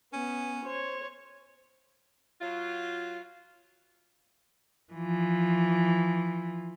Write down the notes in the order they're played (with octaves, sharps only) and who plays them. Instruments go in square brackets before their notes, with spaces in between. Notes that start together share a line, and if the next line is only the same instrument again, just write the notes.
[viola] B3 [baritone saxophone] C#4
[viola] C5 C#5
[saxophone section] F#3 F4
[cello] E3 F3